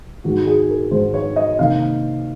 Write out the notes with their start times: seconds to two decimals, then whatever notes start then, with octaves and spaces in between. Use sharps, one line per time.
0.24 G#2 D#3 G#3 F#4
0.46 G#4
0.69 A#4
0.91 G#2 D#3 G#3 C5
1.14 C#5
1.36 D#5
1.58 C3 D#3 A#3 F5